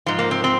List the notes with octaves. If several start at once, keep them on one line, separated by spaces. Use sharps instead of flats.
G#2 F3
A#3
C4
C4